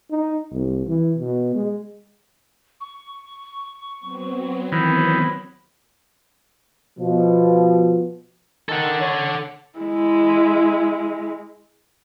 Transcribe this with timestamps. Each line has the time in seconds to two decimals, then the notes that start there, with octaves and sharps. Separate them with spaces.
0.11 D#4
0.52 C2
0.87 E3
1.18 B2
1.55 G#3
2.81 C#6
4.00 F#3 B3 C4
4.72 D#3 E3 B5
6.98 B2 F3
8.69 D#3 A4 F#5
9.00 C#5
9.79 G#3 E4